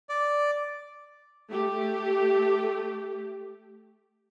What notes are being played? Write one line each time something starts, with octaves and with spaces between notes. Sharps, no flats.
D5
A3 G4